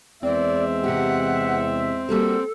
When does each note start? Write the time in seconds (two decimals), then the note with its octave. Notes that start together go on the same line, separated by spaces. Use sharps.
0.23 E2 G#3 C4 D5 E5
0.84 C3 G4 F#5
2.09 G3 A#3 F#4 A4